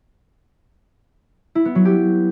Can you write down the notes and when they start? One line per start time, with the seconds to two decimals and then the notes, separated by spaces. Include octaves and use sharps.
1.55 E4
1.65 B3
1.75 F#3
1.85 G4